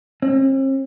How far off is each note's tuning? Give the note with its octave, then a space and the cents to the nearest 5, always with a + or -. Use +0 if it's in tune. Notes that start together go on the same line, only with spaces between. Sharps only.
C4 +45